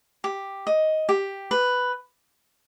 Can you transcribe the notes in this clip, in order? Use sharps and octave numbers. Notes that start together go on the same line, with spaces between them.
G4
D#5
G4
B4